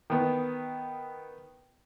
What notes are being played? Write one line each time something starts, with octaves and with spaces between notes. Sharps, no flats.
D#3 B3